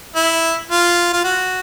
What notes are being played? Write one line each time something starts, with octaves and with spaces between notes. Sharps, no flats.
E4
F4
F4
F#4